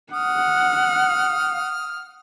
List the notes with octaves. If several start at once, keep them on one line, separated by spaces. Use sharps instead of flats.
F#5 D#6 F6